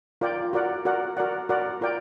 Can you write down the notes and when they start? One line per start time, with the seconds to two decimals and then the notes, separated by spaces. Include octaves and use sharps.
0.21 F4 A#4 D5 G5
0.53 F#4 A#4 D5 F#5
0.85 F#4 A#4 D5 F#5
1.17 F#4 A#4 D5 F#5
1.49 F#4 A#4 D5 F#5
1.81 F4 A#4 D5 G5